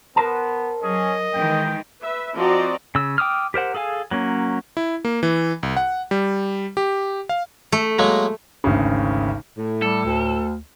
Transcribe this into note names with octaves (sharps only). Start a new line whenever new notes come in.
B3 A#4 C5 A5
F#3 C#4 G#4 D#5
D#3 E3 G#3 G5
B4 E5
F3 C4 F#4 D5 D#5 A#5
C#3 E6
G5 D6 D#6 F6
G4 A#4 C5 F#5
G#4 A4 F5 G#5
F#3 A#3 C#4
E4
A#3
E3
C2
F#5
G3
G4
F5
A3
F#3 G#3 A#3
G#1 D2 C#3
A2
G3 A4
D2